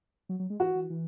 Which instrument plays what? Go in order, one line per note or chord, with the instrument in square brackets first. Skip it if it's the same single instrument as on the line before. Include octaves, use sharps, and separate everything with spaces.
[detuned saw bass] F#3
F#3
G#3
[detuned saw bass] E3 [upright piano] F#4
[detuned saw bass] E3
E3